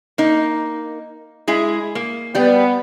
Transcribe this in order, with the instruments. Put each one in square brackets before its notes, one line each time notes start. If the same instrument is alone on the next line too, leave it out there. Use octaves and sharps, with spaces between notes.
[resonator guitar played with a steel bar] A#3 D#4
G#3 E4 G#4
A#3
[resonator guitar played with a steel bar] G3 G5 [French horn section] B3